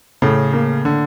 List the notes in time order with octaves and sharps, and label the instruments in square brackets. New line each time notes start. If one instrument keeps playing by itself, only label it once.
[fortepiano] A2 [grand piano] C#3
[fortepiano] A#3
[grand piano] D3